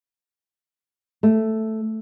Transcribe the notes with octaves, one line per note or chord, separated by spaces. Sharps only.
A3